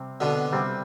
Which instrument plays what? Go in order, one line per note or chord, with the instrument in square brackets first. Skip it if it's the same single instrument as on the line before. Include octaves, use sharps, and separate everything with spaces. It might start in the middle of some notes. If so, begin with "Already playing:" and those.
Already playing: [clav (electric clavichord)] C3 G3 C4
[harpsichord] B2 D3
[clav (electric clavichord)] C3 G3 C4